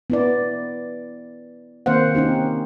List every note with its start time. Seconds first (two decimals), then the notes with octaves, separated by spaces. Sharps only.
0.10 B3 E4 D5
1.86 D#3 A#3 C4 C5 F5 F#5
2.15 C4 C#4 D#4 G4